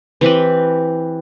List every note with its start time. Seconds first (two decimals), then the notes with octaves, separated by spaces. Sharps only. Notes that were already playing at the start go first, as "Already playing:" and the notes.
0.21 E3 C4 G4 B4